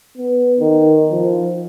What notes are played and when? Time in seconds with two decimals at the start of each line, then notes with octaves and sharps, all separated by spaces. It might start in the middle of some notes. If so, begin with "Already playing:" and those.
0.17 B3
0.59 D#3
1.11 F3